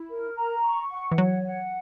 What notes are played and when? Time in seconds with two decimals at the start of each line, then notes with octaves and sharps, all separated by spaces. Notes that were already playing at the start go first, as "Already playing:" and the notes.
Already playing: E4
0.09 A#4
0.36 A#5
0.64 C#6
0.91 F#5
1.12 E3
1.18 F#3 C#5
1.45 F#5